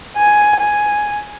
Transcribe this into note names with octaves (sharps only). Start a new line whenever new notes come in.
G#5
G#5